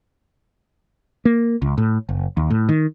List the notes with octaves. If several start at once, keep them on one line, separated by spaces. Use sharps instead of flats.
A#3
C#2
A2
F#1
D#2
A2
D#3